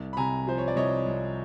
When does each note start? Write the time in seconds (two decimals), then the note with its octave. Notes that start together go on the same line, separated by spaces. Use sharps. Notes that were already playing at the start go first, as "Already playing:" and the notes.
Already playing: C2
0.13 B5
0.17 C3 G#5 A#5
0.47 F3 C5
0.58 C#5
0.68 D5
0.76 C2 C#5 D#5
1.06 C2